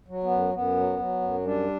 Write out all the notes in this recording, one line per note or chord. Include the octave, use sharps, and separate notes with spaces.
F#3
B3
F#2
F#2 B3
F#3
F#3
F#2
G3 D4